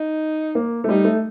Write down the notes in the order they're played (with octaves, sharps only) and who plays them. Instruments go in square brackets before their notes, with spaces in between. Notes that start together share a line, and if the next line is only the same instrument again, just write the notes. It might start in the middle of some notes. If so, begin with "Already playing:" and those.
Already playing: [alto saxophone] D#4
[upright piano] A#3
A3
[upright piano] G3 [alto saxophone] D#4
[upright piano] A3